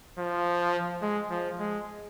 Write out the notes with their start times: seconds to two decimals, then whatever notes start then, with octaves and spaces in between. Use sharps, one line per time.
0.18 F3
1.02 G#3
1.30 F3
1.59 G#3